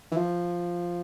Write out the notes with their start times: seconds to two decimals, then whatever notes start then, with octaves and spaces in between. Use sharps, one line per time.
0.12 E3
0.17 F3